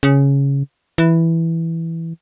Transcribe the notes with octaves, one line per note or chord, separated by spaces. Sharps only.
C#3
E3